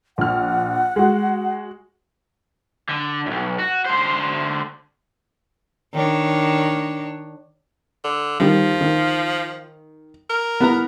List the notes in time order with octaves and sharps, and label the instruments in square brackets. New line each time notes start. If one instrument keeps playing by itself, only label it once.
[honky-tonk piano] A#1 F6 [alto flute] F#5
[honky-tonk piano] G#3 F#4
[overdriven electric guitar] D3
B1 F#2
F#4
D3 C5
[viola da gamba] D#3 D4 C#5
[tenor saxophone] D3
[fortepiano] D#3 G3 [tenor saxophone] F3
[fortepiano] D#3
[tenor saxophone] A#4
[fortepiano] B3 E4 A#5